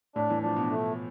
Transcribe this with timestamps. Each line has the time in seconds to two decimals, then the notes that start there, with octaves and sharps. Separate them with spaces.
0.16 A2 D4
0.30 E3
0.43 F3 D4
0.56 B2
0.70 A3